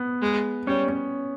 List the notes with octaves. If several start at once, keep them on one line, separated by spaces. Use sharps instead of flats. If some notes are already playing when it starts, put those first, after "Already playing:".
Already playing: B3
G#3
G3 C#4
C#4